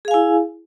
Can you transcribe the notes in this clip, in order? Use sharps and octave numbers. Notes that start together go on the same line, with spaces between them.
E4 G#4 F5 G#5